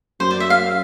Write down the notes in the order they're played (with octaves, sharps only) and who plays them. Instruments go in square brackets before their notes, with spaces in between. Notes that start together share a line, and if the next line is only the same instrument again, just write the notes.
[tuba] F#2 [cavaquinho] C5
[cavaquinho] D5
E5
F5